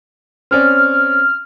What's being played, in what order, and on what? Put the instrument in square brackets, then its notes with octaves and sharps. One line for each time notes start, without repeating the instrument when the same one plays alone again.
[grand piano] C4 C#4 D5 [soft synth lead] F6